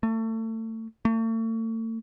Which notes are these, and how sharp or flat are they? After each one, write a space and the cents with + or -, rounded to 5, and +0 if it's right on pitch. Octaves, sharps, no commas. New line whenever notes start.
A3 +30
A3 +40